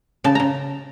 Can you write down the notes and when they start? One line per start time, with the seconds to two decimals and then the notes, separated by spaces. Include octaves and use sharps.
0.24 C#3 A5
0.35 C#3 A#5